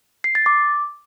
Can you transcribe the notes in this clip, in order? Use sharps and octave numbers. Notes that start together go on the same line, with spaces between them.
C7
A6
D6